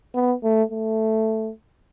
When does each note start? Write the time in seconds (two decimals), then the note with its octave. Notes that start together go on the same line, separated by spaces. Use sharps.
0.15 B3
0.43 A3
0.72 A3